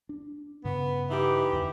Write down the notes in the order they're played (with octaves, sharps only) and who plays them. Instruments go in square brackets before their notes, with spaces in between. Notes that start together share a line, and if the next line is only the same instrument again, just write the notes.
[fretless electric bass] D4
[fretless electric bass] G2 C#3 [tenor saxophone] B3
[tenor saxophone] E3 [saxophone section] D#4 G4
[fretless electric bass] E2 D3